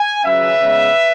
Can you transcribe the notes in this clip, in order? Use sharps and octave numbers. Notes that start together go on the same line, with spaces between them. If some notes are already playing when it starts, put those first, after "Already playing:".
Already playing: G#5
C#3 F#3 C#4 B4 E5
C#3 G#3 B3